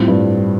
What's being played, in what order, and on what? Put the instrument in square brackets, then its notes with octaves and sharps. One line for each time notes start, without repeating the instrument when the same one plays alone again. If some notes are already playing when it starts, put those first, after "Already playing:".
Already playing: [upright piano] A2 [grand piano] G3 C4 F4
[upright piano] G2